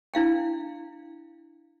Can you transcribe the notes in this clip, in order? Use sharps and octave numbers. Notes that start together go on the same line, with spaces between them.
D4 E4 F5 G5